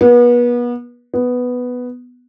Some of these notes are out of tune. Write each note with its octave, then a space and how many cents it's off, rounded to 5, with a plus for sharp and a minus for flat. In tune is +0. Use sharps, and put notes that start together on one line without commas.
B3 -30
B3 +5